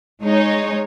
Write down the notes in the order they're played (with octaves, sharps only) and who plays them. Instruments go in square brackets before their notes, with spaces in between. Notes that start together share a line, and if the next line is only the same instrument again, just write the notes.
[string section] G#3 D#4 C#5